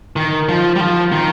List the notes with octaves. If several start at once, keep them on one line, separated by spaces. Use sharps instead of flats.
D#3
F3
G3
F3
D#3